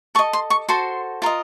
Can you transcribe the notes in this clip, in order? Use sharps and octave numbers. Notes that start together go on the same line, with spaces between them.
A4 D#5 C#6
C6
C#6
F#4 A4 C5 C6
F4 A#4 D#5